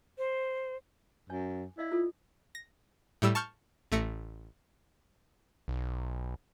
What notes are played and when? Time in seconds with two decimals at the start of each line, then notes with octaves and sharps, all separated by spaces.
0.18 C5
1.30 F#2 C#5 G#5
1.78 E4 D5 D#5 F5
1.92 F4 A4
2.55 A#6
3.22 A2 G3 E6
3.35 A5 C#6 F6 G6
3.92 A1 A3 A#6 C#7
5.68 B1